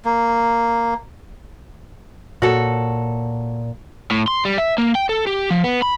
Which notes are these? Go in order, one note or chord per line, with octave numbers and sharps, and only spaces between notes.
A#3
A#2 F#4 A4 C#5
A2
C6
G3
E5
A#3
G5
A4
G4
F3
B3
B5